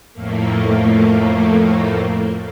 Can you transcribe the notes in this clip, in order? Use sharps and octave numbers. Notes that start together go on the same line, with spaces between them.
F2 A2 A3 A#3